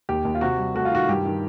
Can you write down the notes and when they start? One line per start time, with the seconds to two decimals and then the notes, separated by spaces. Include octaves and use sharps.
0.09 D#2 G4
0.25 D#2
0.35 F4
0.41 C3 F#4
0.58 G3
0.75 A3 F#4
0.85 F4
0.92 D#3 F#4
1.09 G2 G4
1.25 D#3